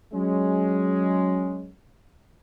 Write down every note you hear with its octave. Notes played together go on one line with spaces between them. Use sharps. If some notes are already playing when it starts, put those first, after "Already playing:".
F#3 G#3 C#4